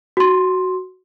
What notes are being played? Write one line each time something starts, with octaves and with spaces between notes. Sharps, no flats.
F#4 C6